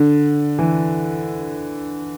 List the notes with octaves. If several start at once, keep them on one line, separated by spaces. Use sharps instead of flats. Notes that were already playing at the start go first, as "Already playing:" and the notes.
Already playing: D3
E3